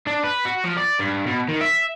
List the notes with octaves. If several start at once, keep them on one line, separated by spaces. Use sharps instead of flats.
D4
B4
F#4
F3
D5
G2
B2
D#3
E5